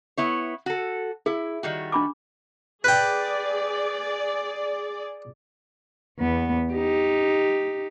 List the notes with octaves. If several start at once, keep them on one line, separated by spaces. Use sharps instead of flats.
B3 E4 C#5
F#4 A4
E4 G#4
D#3 G3 F#4
D4 B5 D6
G#4 B4 D5 G5
E2 B3
D#4 G4